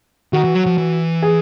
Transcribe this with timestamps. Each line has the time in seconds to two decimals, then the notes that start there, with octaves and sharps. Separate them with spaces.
0.33 D#3 F#4
0.44 E3
0.55 F#3
0.66 F3
0.78 E3
1.22 G#4